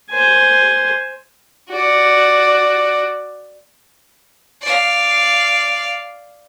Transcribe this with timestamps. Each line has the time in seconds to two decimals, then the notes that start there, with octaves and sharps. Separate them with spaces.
0.11 C5 G#5
1.70 F#4 D5
4.62 D5 F5